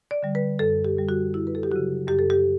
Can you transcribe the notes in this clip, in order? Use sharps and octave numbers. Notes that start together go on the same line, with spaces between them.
D5
D3 G3
B4
F#2 A4
G4
D3 G3
F#4
F#2 E4
B4
A4
G4
C#3 F#3 F#4
F#2 G4
A4
G4